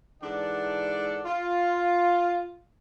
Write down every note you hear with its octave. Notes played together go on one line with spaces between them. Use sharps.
G#2 E3 D4 A4 D5 F#5
F4